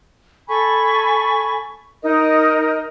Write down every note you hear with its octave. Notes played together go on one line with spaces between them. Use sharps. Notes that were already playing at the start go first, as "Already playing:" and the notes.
A4 G#5 B5 C#6
D#4 A#4 D#5